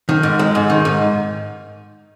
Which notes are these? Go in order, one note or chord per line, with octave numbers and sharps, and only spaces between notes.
D#3
G#2
G#3
G#2
D#3
G#2